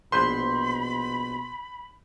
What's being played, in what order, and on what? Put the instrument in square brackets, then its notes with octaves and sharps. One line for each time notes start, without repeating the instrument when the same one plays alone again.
[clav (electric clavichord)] A#1 B4 C5 [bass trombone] B2 [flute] B5 [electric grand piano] C6 G6